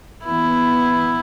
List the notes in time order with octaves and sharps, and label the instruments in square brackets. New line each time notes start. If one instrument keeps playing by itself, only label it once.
[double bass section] E3 B3 [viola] E4